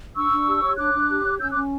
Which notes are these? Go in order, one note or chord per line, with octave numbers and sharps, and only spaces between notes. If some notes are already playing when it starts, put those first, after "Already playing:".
D4 C#6 E6
D4
G4
C#5
D4 D6 F#6
D4
G4
C#5
C#4 E6 G6
C#4 D6 F#6